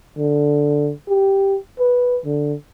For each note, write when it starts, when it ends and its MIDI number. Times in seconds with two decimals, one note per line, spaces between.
0.18 0.92 50
1.09 1.58 67
1.79 2.18 71
2.26 2.54 50